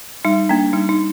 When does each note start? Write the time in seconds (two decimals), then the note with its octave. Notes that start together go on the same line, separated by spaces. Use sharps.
0.25 G3 D#4
0.49 A#3 D4
0.73 G3 D#4
0.89 D#4